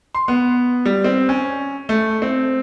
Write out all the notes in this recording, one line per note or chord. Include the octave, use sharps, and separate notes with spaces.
C6
B3
G3
C4
C#4
A3
C4